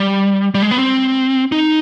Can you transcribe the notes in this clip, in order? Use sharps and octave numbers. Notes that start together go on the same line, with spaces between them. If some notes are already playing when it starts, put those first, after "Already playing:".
Already playing: G3
G3
G#3
B3
C4
D#4